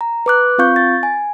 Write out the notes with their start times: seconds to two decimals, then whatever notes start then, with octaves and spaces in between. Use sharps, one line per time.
0.01 A#5
0.26 B4 D6 F#6
0.58 C4 F4 F5 C#6 G6
0.76 A6
1.03 G#5